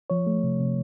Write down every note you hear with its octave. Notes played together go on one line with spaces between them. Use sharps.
F3 C#5
A3
C3
C3